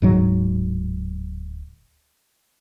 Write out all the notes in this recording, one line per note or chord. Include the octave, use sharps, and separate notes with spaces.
D1 G#2 F#3